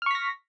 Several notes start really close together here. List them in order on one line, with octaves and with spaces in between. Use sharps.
F6 C#6 B6 A#6